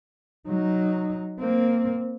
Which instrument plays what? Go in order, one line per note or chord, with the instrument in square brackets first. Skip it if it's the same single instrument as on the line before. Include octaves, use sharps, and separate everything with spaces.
[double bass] F#3 D#4
A#3 C4